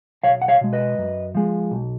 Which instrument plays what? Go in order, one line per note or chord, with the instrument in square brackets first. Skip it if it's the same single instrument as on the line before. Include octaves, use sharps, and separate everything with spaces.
[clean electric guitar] B1 C#5 F5
F#5
C#5 F5
B2 G#3
B4 D#5
F#2
F3 G#3
B1